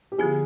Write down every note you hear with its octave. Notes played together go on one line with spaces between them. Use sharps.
G4
D3 F3 B3 F4 G#4